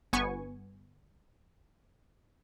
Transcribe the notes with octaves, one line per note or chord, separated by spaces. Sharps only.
G1 B3 G#5 C#6